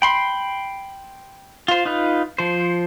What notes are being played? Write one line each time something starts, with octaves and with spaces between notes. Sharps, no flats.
G5 B5 C6
F4 C5
D#4 F4 B4
F3 C5